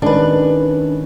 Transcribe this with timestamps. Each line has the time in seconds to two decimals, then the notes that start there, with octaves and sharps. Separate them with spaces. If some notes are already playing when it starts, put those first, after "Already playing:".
0.02 D#3 G#3 C#4 D4 B4